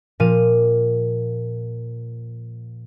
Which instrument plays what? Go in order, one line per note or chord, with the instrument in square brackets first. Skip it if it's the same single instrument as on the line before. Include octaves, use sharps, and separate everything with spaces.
[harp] A#2 F3 F5 D#7